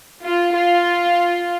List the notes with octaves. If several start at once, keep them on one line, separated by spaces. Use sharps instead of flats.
F4
F4